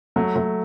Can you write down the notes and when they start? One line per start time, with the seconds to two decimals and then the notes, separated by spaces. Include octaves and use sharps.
0.16 F#3 A3
0.35 F#3 A3